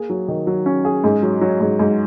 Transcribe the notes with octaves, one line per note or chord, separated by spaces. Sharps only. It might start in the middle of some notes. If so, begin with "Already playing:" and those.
Already playing: A#3 G#4
F#3
D#3
F#3
C#4
G#4
G#2
F#3
F#3
G#2
G#2